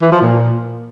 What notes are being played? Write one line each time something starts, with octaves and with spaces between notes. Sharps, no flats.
E3
F3
A#2